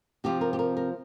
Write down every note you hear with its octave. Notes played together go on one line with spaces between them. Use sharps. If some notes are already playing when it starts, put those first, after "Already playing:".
C3 F3 C4 G4
A#4
G4
A#4
A#4